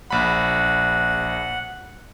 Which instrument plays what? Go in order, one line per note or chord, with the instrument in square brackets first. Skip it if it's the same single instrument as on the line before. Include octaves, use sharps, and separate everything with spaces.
[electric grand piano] A#1 B5 [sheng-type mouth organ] F#5